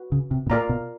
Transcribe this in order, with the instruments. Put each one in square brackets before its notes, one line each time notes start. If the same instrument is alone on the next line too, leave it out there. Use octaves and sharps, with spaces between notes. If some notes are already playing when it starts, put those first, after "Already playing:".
Already playing: [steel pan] F#4 B4
[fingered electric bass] C#3
C3
B2
[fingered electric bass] A#2 [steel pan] F4 A#4 D5 F5 A#5
[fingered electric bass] B2